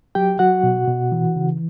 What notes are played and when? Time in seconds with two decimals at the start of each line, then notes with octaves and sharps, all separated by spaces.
0.15 F#3 G4 G5
0.39 F#3 F#4 F#5
0.63 B2
0.88 B2
1.12 E3
1.36 C#3